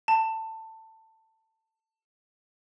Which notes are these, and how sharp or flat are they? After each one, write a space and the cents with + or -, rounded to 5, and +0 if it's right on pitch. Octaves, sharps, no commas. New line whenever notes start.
A5 +20